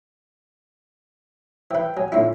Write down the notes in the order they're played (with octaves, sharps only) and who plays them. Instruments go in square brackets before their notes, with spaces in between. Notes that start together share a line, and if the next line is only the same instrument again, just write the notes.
[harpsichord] E3 B4 [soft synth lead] G5
[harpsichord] F#3 [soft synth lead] G#5
[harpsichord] A2 D3 E4 [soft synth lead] F4